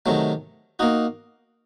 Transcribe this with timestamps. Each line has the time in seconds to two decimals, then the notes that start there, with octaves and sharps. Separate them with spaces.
0.06 C3 D#3 F#3 A3
0.79 A#3 D#4 F#4